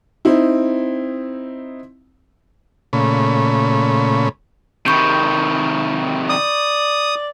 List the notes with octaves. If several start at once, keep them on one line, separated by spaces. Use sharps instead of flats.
C4 D#4 E4
A#2 C#3 A3 C#5 B5
C3 D#3 B5 C#6 G6
D5 D#6